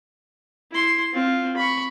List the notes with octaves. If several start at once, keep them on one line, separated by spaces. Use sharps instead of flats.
E4 C6
C4 F4
B5 C#6